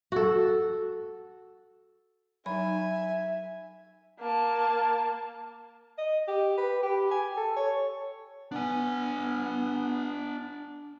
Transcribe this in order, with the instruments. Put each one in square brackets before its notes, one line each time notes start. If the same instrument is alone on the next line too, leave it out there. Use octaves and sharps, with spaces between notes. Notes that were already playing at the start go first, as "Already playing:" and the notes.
[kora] F#4 A4
[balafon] F#3 D#4 [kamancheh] E5 [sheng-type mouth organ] G#5 [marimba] B5
[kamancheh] A#3 A5
[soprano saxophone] D#5
G4
B4
G4
G#5
A4
C#5
[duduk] B3 [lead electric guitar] D4 G#5